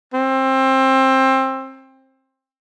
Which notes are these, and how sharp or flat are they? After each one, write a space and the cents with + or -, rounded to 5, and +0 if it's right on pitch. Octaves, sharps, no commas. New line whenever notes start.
C4 +20